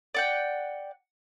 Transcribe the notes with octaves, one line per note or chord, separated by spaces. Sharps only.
D5 F#5 G5